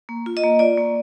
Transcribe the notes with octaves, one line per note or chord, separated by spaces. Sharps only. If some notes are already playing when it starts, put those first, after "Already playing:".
A#3
F4
D#5
A#3
F4 D5
A#3